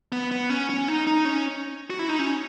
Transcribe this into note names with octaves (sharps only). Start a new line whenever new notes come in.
B3
B3
C#4
C#4
D#4
D#4
C#4
F#4
E4
D#4
C#4